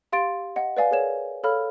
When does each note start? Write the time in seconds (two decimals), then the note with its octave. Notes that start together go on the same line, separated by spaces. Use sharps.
0.12 G4 F5 C6 A6 D7
0.56 D#5 F#5
0.77 B4 D5 F5 G#5
0.91 G#4 A#4 C#5 E7
1.44 A4 C#5 F5 B5 F6